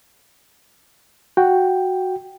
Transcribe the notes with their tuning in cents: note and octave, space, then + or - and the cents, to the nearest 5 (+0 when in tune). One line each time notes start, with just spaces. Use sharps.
F#4 +0 G5 +0